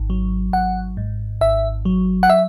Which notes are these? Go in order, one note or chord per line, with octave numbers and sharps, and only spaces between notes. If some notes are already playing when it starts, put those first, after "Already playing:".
Already playing: G#1
F#3
G#1 F#5
G#2
G#1 E5
F#3
F#5
E5